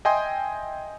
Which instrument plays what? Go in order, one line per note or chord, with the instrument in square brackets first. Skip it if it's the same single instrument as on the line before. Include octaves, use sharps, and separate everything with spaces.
[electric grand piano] D#5 E5 G5 G#5 C6 D#6